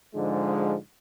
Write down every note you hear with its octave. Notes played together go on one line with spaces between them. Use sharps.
G#2 D3 F3 G#3